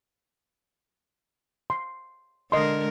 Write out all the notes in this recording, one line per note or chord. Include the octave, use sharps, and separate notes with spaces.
C6
D3 G#3 A#4 D#5 C6